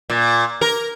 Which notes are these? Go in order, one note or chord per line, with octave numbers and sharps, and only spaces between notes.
A#2
A#4